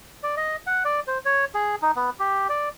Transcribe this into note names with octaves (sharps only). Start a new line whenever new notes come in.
D5
D#5
F#5
D5
C5
C#5
G#4
D#4
B3
G4
D5